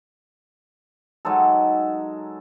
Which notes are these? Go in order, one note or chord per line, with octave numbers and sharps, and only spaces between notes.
F#3 G#3 D#4 A4